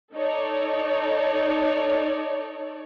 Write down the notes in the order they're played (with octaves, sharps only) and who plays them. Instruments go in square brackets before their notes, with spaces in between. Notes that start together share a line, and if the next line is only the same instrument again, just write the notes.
[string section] D#4 A4 C#5 D5